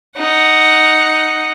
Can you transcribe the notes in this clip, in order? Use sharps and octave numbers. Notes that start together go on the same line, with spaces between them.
D#4 F#5